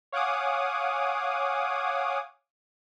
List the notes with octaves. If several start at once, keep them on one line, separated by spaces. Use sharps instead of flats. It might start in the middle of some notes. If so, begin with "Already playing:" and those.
C#5 F5 F#5 G#5 D6 D#6